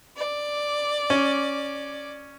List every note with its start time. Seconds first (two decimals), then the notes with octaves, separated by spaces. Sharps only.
0.16 D5
1.10 C#4